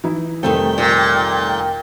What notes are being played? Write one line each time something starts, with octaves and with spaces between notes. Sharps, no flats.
E3 D#4 E4
F1 D#3 G3 A3 C4 A4 G5
A#2